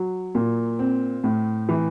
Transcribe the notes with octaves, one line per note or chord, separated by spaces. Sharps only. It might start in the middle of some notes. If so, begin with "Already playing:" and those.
Already playing: F#3
A#2
C4
A2
E3